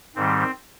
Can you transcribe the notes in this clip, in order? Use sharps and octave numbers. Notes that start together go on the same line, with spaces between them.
G#2 D#3 G3 C4